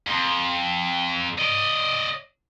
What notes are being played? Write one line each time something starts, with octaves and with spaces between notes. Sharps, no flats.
F2
D5 D#5